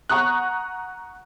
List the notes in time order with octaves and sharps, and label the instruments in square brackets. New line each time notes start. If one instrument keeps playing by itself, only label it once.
[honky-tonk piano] F#5 A#5 C#6 D#6 F#6